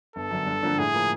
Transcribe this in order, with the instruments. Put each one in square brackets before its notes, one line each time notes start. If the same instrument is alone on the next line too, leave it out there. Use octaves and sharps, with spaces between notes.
[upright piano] G1 [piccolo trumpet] A4
[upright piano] F#2 D3
G2
D3 F3 A#3 D4
[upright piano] A2 [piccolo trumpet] G#4
[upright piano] F3 A#3